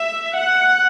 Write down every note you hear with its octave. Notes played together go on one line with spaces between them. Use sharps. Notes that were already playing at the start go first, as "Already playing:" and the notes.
Already playing: E5
F#5